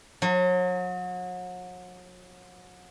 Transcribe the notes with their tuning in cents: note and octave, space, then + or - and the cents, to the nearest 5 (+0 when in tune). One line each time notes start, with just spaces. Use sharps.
F#3 -35